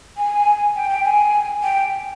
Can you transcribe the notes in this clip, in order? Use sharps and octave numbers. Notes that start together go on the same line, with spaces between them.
G#5
G5
G5
G#5
G5